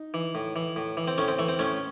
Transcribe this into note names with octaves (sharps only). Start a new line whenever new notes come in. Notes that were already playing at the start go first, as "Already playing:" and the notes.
Already playing: D#4
E3
A2
E3
A2
E3
C4
A2 A3 C#4
C4
E3 A3
C4
A2 A3 C#4